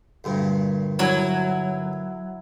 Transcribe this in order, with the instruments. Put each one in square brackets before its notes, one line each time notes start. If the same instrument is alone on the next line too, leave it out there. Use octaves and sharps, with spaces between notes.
[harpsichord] D2 G2 A#2
[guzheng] F#3 E4